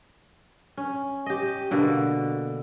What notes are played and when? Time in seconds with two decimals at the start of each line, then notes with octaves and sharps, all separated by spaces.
0.77 C#4
1.26 G4 D#5
1.71 B2 D3 A#3